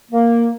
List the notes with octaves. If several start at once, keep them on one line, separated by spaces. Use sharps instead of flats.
A#3